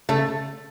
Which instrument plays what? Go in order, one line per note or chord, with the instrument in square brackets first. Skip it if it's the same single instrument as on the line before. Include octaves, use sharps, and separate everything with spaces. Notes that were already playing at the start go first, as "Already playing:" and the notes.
[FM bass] C#3 [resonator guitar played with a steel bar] A3